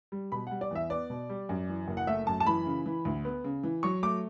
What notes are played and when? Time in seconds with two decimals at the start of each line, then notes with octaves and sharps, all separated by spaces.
0.12 G3
0.32 B2 B5
0.47 G3 F#5
0.61 D5
0.71 E2 E5
0.90 B3 D5
1.10 B2
1.30 G3
1.49 F#2
1.69 E3
1.88 F#1
1.97 F#5
2.07 A3 E5
2.27 F#2 A5
2.40 A5
2.46 E3 B5
2.66 C#3
2.86 E3
3.05 D2
3.25 B3
3.44 C#3
3.63 E3
3.83 F#3 C#6
4.03 A3 D6